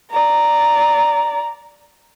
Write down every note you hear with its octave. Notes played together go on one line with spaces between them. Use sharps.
D5 A#5